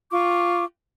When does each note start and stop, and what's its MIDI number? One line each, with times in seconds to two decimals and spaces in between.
0.10 0.64 65
0.10 0.64 85
0.10 0.64 86